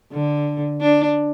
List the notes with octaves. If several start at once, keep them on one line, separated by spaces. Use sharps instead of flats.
D3
D4